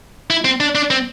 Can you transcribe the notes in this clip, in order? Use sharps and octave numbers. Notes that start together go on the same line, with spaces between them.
E4
C4
D4
D4
C4